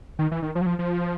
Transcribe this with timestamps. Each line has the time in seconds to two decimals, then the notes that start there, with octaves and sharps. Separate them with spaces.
0.19 D#3
0.32 E3
0.42 D#3
0.55 F3
0.61 F#3
0.66 F3
0.79 F3